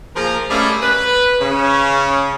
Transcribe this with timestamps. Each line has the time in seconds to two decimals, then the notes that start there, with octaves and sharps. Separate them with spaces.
0.16 F3 A#3 F4 G#4 A#4
0.50 G3 A3 A#3 C#4 G#4 A4
0.82 B4
1.41 C#3 C#4